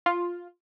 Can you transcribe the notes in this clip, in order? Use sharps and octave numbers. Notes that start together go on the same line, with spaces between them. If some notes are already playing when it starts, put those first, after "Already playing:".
F4